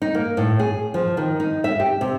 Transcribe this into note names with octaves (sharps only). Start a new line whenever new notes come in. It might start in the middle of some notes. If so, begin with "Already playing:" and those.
D#4
A#3
A2
G#4
F3
D#3
D#4
E5
G4
C3